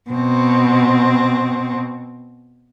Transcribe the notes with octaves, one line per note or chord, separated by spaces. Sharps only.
B2 C4